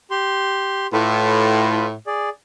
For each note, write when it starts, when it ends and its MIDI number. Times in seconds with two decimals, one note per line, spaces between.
0.11 0.87 67
0.11 0.87 84
0.92 1.93 45
0.92 1.86 65
0.92 1.86 71
2.07 2.29 68
2.07 2.29 74